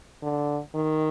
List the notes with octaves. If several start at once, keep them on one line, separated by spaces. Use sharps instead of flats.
D3
D#3